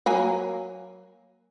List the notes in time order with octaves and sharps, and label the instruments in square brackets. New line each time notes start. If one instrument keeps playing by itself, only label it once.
[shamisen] F#3 A#3 G#5